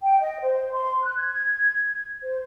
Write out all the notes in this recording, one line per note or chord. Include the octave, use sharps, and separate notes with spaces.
G5
D#5
C5
C6
F#6
G#6
C5